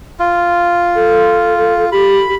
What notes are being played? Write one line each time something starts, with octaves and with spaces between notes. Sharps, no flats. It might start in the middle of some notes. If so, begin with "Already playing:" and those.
F4
A4
G4 B5